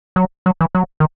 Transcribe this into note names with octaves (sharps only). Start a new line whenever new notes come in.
F#3
F#3
E3
F#3
D#3